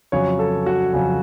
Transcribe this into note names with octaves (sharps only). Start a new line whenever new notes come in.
F2 C#3 F#3 C#4 C#5
A4
F#4
F2 C#3 F#3 C#4